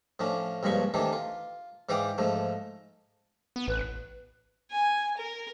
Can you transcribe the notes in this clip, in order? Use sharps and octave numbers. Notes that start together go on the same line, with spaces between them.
A2 F3 C#4 D4
C#2 G2 A#2 F3 B5 C#6
C3 D#3 E3 A3 D4
F4
G#2 E3 D5 F5 G5 D#6
G#2 F3 A3
B3
A1 B4
G#5
A#4